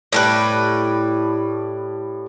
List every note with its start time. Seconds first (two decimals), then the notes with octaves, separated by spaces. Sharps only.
0.12 A2 G3 B4